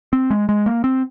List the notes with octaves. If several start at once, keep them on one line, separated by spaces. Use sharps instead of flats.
C4
G#3
G#3
A#3
C4